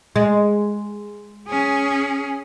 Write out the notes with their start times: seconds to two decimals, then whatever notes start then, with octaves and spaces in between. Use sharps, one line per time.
0.16 G#3
1.48 C#4 G#4